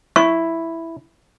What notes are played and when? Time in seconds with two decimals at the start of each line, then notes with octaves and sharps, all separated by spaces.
0.16 E4 C#6